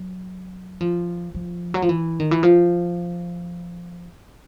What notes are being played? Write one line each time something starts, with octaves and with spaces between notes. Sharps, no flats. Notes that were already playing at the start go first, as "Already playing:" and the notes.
Already playing: F#3
F3
F3
F#3
F3
E3
D#3
E3
F3